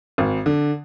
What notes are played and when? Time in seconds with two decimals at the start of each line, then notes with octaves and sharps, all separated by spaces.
0.18 G#1
0.46 D3